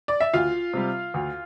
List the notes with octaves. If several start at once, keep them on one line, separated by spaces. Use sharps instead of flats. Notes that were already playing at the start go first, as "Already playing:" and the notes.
D5
E5
D2 F4 F5
C3 G3
D2